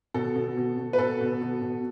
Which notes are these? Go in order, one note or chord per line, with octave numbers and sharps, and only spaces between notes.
B2 A4
B2
B2
B2
B4
B2 A4
B2
B2
B2